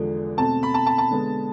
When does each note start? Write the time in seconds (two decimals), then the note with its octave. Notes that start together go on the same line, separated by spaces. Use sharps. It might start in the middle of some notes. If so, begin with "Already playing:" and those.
Already playing: E2 D3 F3 G#3 B3
0.38 B2 A3 C4 A5
0.63 B5
0.74 A5
0.86 A5
0.98 A5
1.11 D3 G#3 B3